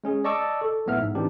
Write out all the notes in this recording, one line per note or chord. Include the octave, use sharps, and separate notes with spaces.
G#3 C#4 G#4
D5 D#5 A5 C#6 D6 E6
A4
A#1 A2 B3 E5 F6
G#2
E3 C4 D4 D#4 G4